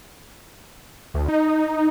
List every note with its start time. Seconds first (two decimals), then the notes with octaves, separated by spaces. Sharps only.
1.14 D2
1.28 D#4